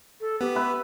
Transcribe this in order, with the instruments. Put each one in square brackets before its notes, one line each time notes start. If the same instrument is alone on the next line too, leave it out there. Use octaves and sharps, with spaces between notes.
[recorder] A4
[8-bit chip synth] B3 [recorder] G4
[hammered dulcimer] B4 E5